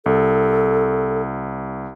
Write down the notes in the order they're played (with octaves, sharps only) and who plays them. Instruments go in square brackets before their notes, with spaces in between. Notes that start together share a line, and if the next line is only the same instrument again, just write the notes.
[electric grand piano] C2 [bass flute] A4